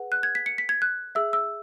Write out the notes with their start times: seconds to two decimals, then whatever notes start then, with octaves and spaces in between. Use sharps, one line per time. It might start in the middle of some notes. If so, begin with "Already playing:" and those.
Already playing: G#4 B4 F#5
0.12 F#6
0.23 G#6
0.35 B6
0.46 C#7
0.58 B6
0.69 G#6
0.82 F#6
1.15 G#4 E5 E6
1.33 E6